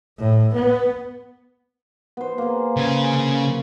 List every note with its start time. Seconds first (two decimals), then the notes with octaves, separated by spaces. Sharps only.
0.18 A2
0.54 B3
2.17 B3 C5
2.38 A#3 G#4
2.77 C#3 G#5